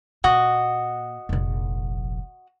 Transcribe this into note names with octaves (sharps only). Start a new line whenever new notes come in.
A#2 F#4 D#5
F1 A#1